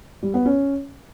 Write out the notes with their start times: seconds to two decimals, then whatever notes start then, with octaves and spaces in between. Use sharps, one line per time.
0.22 G3
0.34 B3
0.45 C#4